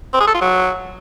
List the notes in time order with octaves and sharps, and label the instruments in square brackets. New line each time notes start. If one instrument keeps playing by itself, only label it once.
[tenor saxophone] C4
G#4
A4
F4
F#3